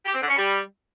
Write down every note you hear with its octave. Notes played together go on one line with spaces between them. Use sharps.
G4
C4
D3
C#4
G3